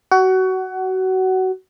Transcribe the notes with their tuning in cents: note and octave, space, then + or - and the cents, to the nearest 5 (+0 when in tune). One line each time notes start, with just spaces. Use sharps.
F#4 +25 F#5 +20